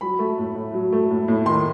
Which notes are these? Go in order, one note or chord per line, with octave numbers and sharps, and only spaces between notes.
F#3 B5
A3
A2
A2
F#3
A3
A2
A2
D#3 C6